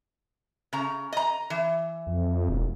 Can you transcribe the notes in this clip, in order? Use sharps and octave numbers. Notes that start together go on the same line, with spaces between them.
C#3 A#5
D#5 A#5
E3
F2
E1